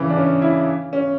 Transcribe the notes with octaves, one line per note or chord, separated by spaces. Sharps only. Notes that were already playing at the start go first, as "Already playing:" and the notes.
Already playing: C#3 E3
D4
C#4
E4
C#4